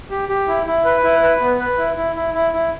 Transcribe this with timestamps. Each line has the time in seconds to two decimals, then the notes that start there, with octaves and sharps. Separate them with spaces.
0.10 G4
0.29 G4
0.48 E4
0.67 E4
0.85 B4
1.04 E4
1.22 B4
1.41 B3
1.59 B4
1.78 E4
1.96 E4
2.16 E4
2.34 E4
2.53 E4